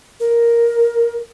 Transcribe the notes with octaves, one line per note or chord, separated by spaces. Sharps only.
A#4